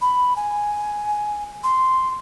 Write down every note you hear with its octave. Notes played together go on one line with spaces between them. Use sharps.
B5
G#5
C6